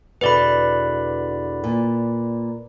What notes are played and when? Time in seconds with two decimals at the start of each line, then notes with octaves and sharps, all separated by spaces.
0.21 E2 B2 D3 B4 D5 B5
1.64 A#2